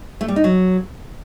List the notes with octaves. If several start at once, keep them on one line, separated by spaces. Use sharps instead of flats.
A3
G3
D#4
F#3